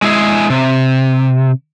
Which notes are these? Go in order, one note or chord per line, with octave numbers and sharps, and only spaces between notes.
G#3 E4 G4 G#4
C3